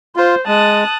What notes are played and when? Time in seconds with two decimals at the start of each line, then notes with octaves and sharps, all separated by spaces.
0.16 F4 C5
0.48 G#3 A5 D#6 F#6